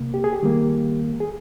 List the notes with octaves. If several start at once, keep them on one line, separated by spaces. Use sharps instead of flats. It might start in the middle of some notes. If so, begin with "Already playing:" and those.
Already playing: C3 A#3
G4
G#4
G4
D#3 G3 A#3
G#4